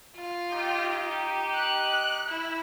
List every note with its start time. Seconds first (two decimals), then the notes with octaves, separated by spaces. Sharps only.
0.16 F4
0.51 D#4 G4
1.54 F#6
2.28 E4